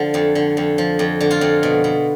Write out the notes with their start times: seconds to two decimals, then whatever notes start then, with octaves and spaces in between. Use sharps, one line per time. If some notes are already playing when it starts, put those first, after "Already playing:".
Already playing: D3 F3
0.14 F2
0.35 D3
0.57 F2
0.78 F3
0.99 F2
1.21 D3
1.31 F4
1.41 F2
1.63 B2
1.84 B2